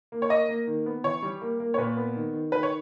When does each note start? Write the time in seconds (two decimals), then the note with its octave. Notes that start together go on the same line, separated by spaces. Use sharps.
0.12 A#3
0.22 C#5
0.30 A#3 D#5
0.48 A#3
0.67 D#3
0.86 B3
1.04 E3 C#5
1.22 G3
1.41 A#3
1.60 A#3
1.74 C#5
1.78 A#2 B4
1.97 B3
2.15 D#3
2.33 D#3
2.52 D#3 B4
2.63 C#5